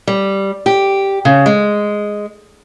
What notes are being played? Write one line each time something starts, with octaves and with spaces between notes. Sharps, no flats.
G3
G4
C#3
G#3